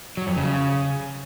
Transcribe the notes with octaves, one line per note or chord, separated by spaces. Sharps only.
F#3
F2
C#3